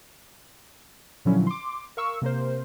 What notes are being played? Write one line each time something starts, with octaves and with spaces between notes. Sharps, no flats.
A#2 D3 F3 F#3 C#4 E4
C6 D6
A#4 F5 C#6 E6
C3 A#3 A#4 C5